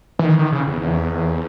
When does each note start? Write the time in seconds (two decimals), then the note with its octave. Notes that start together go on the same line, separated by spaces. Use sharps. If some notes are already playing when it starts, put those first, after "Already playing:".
0.19 E3
0.25 D#3
0.39 D#3
0.52 C#3
0.67 E2
0.81 E2